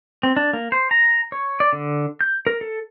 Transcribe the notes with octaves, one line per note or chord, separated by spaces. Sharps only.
C4
D4
A#3
C5
A#5
C#5
D5
D3
G6
A#4
A4